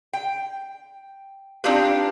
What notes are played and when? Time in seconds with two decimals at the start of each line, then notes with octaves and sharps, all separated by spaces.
0.13 G5
1.64 C4 D4 D#4 F4 G4 B4